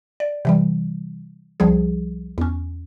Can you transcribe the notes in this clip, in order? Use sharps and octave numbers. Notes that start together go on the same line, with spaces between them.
D5
C3 E3 G3
C2 F3 G3 G#4
E2 C#4